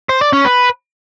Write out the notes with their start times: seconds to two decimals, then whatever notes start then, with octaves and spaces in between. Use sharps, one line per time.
0.09 C5
0.21 D5
0.33 C#4
0.45 B4